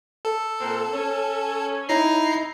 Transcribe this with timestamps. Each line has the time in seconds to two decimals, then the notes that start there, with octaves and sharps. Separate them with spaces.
0.25 A4
0.61 A#2 A#3 C4
0.94 C#4
1.89 D#4 E4 A#5 C7